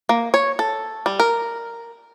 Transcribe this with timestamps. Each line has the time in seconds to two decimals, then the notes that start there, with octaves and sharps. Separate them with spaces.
0.09 A#3
0.34 C#5
0.59 A4
1.06 G3
1.20 A#4